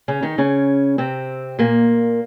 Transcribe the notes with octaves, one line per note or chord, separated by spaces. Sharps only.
C#3 C#4
D#3 D#4
C#3 C#4
C3 C4
A#2 A#3